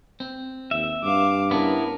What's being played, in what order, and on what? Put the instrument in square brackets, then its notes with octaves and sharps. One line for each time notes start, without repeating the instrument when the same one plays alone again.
[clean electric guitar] C4
[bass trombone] D#2 [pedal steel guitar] E5
[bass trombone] G2 [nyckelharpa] F5 D6
[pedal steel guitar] B3 E4 [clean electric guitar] C#4 D4 [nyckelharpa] A#4